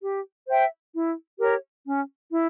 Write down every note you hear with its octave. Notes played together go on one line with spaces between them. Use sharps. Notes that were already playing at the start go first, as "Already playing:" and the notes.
G4
C5 E5 G5
E4
G4 A#4 C#5
C#4
E4